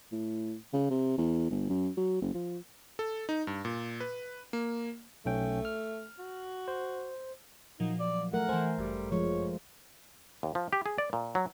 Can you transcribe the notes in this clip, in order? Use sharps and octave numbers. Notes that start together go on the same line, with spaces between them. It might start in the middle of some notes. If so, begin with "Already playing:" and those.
A2
C#3
C3
E2
G1
F#2
F#3
F#1
F3
A4
D#4
G2
A#2
B4
A#3
B1 A3 C#4 G5
F6
F#4
C5
A#2 F3 F#3 D#4
D5
A3 A#4 F#5
E3 A3 C5 G#5
G1 F#2 G3
F3 G#3 C#5
D#2
F3
G4
G#4
D5
A#2
F#3